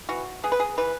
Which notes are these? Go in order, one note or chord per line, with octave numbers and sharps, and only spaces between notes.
E3 F#4
B3 G#4
B4
G#4
E3 B4